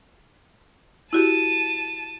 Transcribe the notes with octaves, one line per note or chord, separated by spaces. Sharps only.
E4 F#4 G4 A5 D#7